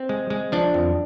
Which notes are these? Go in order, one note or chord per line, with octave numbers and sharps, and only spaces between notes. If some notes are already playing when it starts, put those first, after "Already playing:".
Already playing: C4
G#3
G#3
F3 D4
F2